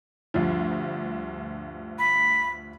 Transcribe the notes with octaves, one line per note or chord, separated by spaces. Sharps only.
D2 G2 F3
B5